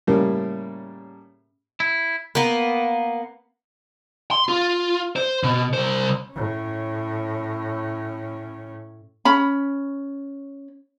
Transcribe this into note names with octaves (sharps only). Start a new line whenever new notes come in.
A2 C#3 G3 A#3
E4
A#3 B3
C6
F4
C5
B2
C2 C5
A2 C#4
C#4 B5